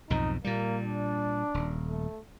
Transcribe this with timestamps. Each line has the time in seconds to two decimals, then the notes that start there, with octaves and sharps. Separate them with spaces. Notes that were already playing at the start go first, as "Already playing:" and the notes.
0.10 B1 F2 G#2 D#4
0.44 A#2 G3 A#3
0.83 D4
1.54 D#1
1.87 A3